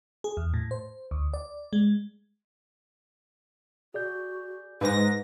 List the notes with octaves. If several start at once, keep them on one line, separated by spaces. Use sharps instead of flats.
G#4
E2
A2
C5
D2
D5
G#3
F#4 G#4 D5 G6
G#2 D#4 B4 A#6